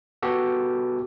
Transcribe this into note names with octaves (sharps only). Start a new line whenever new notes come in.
B3 F#4 G4 A4